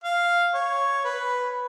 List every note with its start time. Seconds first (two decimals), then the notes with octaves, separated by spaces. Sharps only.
0.04 F5
0.54 C#5
1.05 B4